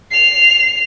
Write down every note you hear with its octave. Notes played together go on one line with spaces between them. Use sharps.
C7 F7